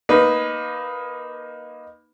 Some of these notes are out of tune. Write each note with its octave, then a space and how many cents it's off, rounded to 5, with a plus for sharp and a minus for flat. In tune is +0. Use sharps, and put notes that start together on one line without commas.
A#3 +20 D#4 +0 B4 +0